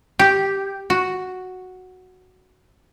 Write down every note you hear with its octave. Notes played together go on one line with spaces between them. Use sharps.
G4
F#4